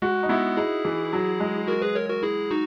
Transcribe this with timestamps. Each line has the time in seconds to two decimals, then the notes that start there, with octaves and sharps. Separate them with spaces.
0.02 G#3 F#4
0.23 D#4
0.29 G#3 B3 E4
0.57 D#4 E4 G#4
0.85 E3
1.13 F#3
1.40 G#3
1.68 F#4 A#4
1.82 G#4 B4
1.95 A#4 C#5
2.09 F#4 A#4
2.23 E4 G#4
2.51 D#4 F#4